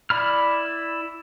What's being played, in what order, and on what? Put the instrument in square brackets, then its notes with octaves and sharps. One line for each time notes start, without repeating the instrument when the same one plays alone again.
[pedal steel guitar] E4 D5 B5 F6